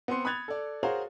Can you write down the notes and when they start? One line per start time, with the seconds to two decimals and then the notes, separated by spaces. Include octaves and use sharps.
0.08 B3 C4 F#5 C6 C#7
0.25 B5 D#6 F#6 G#6 A6 F7
0.48 A4 D5
0.83 F#4 G#4 A#4 C5 C#5 F5